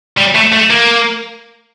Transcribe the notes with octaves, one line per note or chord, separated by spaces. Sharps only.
G3
A3
A3
A#3